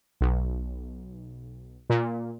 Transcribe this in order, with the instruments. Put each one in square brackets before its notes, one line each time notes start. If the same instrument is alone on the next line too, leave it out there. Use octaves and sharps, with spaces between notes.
[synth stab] B1
A#2